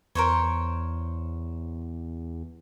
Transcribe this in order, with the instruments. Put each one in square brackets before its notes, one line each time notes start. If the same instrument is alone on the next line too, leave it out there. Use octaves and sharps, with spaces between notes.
[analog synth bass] E2 [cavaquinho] A#4 C5 C#5